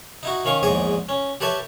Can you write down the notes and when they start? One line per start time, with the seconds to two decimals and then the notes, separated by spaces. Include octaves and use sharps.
0.23 D#4 E4 F#4
0.45 D#3 C#4 F5 C#6
0.63 A#1 E2 G#2 G#4 C#5 D#5
1.09 C#4
1.41 G4 A4 B4 C#5 E5 A5